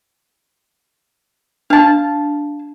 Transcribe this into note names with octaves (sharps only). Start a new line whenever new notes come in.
D4 F5 A5